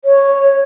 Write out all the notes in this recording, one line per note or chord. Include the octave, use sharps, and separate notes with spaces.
C#5